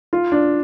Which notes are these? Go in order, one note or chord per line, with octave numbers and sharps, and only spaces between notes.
F4
D4